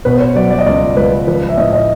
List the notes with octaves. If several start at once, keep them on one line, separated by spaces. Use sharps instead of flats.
B2 B4
C5
C#5
F#3 D5
D5
D#5
C#2 D5
C#2 B4
F3 B4
E5
A2 D#5
D#5